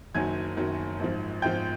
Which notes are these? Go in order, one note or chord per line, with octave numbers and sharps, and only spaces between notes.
F#1 F#2 D#3 F#3 G#5 G#6
F#1 F#2 D#3 F#3
G#1 G#2 F3
G#1 G#2 F3 G5 G6